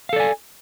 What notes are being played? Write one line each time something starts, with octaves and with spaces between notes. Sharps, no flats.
A4 D5 F5 G#5